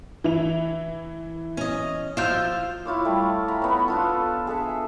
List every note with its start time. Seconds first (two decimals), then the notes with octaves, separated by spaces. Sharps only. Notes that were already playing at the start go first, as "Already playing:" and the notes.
0.24 E3 E4 F7
1.57 C#4 D#5
2.17 F3 F4 E6 G6 E7
2.86 E4 F4 C#5 D6
3.05 G3 A3
3.48 F#5 A#5 B5
3.62 B3 C#5
3.88 D4 F4 A4
4.47 G#4 A4 E5